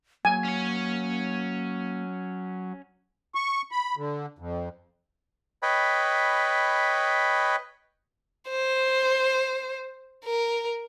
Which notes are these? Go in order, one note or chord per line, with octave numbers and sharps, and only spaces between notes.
F#3 A#3 G#5
C#4 C#5
C#6
B5
D3
F2
B4 C#5 D#5 G5 B5
C5
A#4